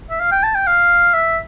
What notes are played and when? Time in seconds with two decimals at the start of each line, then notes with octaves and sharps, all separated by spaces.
0.10 E5
0.20 F5
0.32 G5
0.43 A5
0.55 G5
0.67 F5
1.14 E5